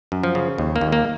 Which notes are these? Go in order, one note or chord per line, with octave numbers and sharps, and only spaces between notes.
F#2
F3
C#3
D#2
A#3
D#2
A#3